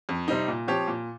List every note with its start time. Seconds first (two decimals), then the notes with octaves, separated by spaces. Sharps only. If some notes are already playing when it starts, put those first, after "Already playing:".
0.09 F2
0.28 C3 G3 C4 D#4
0.48 A#2
0.67 F3 C4 G4 C#5
0.87 A#2